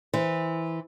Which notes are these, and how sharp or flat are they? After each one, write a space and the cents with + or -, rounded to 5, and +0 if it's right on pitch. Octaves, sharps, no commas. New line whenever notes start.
E3 -10 C5 -15